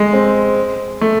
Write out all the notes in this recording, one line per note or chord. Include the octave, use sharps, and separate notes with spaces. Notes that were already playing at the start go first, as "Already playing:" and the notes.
Already playing: G#3
C4
A3